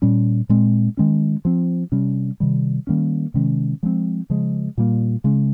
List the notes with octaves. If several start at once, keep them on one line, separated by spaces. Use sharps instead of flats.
A#2 G3 C#4
A#2 G#3 C4
D#3 G#3 C#4
F3 C4
C3 G3 C#4
C3 D#3 G3
D#3 G3 A#3 C#4
C3 D#3 G#3 C#4
F3 G#3 C4
C#3 F3 G#3
A#2 G3 A#3
C#3 G#3 C#4